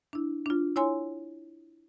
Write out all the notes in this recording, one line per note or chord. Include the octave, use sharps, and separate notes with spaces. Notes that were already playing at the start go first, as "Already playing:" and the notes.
D4 E4
D4 F4
E4 C#5 G#5 C6